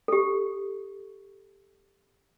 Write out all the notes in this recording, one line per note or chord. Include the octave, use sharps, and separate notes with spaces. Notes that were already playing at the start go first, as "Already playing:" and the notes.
G4 A4